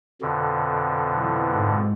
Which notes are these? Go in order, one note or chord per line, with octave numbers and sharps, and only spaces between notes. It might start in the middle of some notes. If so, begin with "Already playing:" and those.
F2 B2 D3
B1 E3
G#2